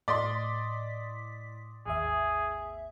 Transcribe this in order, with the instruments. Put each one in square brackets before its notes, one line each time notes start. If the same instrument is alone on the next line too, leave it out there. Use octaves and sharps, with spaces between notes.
[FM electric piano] A2 B6 [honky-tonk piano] D5 D#5 C6
[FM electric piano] G#1 D#2 E5 [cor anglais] G#4